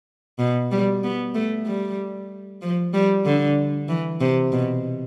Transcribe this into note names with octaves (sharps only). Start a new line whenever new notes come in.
B2
G3
B3
A3
G3
F3
G3
D3
E3
C3
B2